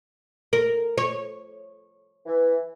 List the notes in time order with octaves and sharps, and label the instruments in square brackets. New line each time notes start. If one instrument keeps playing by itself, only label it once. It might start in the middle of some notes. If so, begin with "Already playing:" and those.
[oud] A#4
C#5
[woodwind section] E3